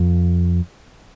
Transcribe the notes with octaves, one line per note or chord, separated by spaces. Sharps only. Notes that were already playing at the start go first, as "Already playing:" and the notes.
Already playing: F2